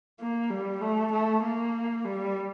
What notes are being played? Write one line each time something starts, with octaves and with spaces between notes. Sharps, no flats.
A#3
G3
A3
A3
A#3
G3